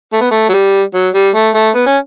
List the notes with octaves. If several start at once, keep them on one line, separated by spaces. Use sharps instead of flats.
A3
B3
A3
F#3
G3
F#3
G3
A3
A3
B3
C#4